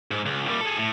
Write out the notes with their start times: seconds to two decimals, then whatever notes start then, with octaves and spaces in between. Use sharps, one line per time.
0.11 G#2
0.26 C#2
0.47 A#2 G3
0.61 G#4 A4
0.77 A2